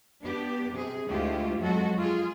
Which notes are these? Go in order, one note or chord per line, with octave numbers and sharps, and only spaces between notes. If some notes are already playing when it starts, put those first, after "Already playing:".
B3 D4 G4
C3 G#4
D2 G#3 A3 E4 F4 G4
F2 F#3 G#3 F#4 A4
F4 G#4